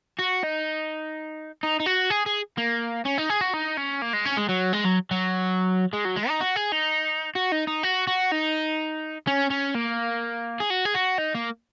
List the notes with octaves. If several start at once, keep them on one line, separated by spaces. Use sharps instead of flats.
F#4
D#4
D#4
D#4
F#4
G#4
G#4
A#3
C#4
D#4
G#4
F#4
D#4
C#4
A#3
G#3
C#4
G#3
F#3
G#3
F#3
F#3
G#3
F#3
G#3
D#4
F#4
G#4
D#4
F#4
D#4
D#4
F#4
F#4
D#4
C#4
C#4
A#3
G#4
F#4
G#4
F#4
D#4
A#3